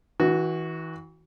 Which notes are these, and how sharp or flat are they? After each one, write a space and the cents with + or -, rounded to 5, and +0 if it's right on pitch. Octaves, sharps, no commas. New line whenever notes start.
E3 -35 F#4 +0